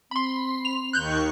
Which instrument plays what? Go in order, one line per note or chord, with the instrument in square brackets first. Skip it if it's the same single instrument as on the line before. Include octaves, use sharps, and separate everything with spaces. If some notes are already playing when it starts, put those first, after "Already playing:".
[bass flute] C4 [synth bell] B5 C6
[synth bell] F7
[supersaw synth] D#2 D#3 C#6 [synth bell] F#6 G6